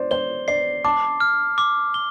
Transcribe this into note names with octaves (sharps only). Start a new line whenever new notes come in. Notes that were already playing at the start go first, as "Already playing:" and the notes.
Already playing: C5 D5
C5 G7
D5 C7
A5 D6
F6
D6
G7